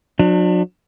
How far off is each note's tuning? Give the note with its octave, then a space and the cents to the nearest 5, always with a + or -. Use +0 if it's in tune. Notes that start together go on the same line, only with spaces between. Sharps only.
F#3 -40 D4 +30